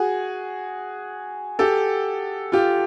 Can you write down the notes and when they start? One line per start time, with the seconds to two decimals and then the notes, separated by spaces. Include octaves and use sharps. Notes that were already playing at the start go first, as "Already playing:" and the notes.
Already playing: F#4 G#4
1.59 G4 A4
2.52 F4 G4